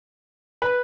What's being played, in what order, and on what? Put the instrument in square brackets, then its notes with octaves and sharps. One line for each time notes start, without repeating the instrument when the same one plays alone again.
[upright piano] B4